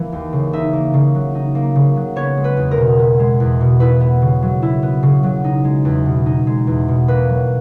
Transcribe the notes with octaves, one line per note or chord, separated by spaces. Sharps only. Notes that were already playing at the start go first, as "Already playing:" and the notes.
Already playing: E3 A#3
D#2
C#3
D#4 E5
A#3
C#3
F#3
D#4
A#3
C#3
F#3
B3 C#5
G#3
B4
E2
A#4
B2
B3
G#3
E2
B2
E4 B4
B3
C#3
F#3
E4
B3
C#3
F#3
D#4
G#3
E2
B2
D#4
G#3
E2
B2
A#3 B4
F#3